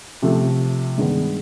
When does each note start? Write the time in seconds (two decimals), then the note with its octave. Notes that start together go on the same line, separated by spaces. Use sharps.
0.22 C3 F3 A3
0.98 G2 D#3 G#3 B3